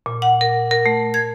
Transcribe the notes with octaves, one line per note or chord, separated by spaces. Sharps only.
A#2
F#5
A#4
A#4
A3
G#6